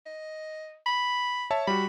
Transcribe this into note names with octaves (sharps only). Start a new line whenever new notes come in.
D#5
B5
C#5 E5 A5
G3 F#4 B5